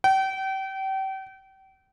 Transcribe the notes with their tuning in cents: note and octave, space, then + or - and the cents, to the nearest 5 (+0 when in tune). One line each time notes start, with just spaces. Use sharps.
G5 -35